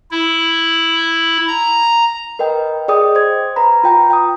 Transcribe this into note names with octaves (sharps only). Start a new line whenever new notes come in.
E4
A#5
A#4 B4 D#5 G5
G#4 D5 D#5 G5 D#6
C5 G#6
B4 A#5 B5
F4 G5 A#5
G5 D#6